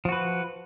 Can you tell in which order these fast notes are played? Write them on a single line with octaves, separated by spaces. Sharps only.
F3 F#4 B4